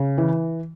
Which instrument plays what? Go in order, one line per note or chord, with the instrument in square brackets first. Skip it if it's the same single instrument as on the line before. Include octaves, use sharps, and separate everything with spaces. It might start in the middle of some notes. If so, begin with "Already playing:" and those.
Already playing: [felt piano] C#3
E3